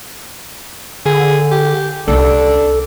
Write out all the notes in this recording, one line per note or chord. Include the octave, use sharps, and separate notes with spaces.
D3 G#4
G4
C2 C#4 D4 A4